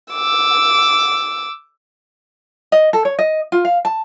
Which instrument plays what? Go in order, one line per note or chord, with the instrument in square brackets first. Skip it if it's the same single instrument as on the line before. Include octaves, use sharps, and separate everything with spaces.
[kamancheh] D6 E6
[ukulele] D#5
A4
C#5
D#5
F4
F5
A5